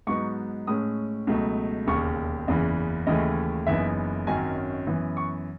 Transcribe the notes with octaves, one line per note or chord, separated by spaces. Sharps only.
G#2 F#3 B3 D#4 C#6
A2 G#3 C#4 D#6
C#2 B2 F#3 A3
E1 D#2 C#3 C#6
F#1 E2 C#3 E3
D#2 C#3 E3 A3 D#5
F#1 F#2 E3 B3 D#4 E5
G#1 F#2 D#3 F#3 C#4 G#5
F#2 E3 B3
C#6